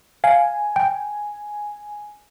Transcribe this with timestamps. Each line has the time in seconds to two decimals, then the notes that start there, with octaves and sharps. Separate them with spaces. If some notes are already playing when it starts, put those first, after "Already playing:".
0.24 F5 G#5
0.76 G5